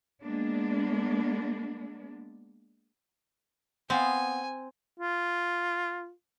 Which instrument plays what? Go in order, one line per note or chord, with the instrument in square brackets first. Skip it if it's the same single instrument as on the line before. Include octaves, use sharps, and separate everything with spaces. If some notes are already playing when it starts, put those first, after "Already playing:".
[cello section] G#3 A#3 B3 D4
[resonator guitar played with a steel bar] B3 F5 [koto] C4 [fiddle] G#5
[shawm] F4